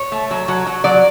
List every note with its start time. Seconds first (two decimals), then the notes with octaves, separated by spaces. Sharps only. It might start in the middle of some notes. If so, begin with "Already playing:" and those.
Already playing: C#5
0.12 A3
0.31 F#3
0.48 F#3
0.67 F#3
0.84 F#3 D5